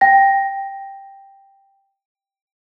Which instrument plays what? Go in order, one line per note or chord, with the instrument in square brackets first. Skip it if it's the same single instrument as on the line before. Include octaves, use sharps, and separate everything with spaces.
[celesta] G5 A#6